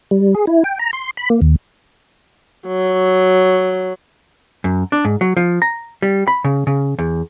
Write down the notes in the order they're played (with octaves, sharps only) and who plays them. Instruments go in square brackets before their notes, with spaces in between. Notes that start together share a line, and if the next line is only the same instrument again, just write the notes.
[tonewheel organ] G3
G#4
E4
G5
A#5
C6
B5
A#3
D#2
[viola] F#3
[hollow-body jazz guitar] F#2
D4
G#2
F#3
F3
A#5
G3
B5
C#3
C#3
E2